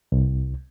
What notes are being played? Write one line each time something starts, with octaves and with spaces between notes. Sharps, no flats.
C2